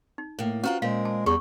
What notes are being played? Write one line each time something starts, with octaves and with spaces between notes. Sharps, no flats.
D#4
A2 A#3
C4 C#4 F4 F#4 B4 A#5
A#2 G#3 C4 A#4 F5
A5
E2 G3 G#4 C#6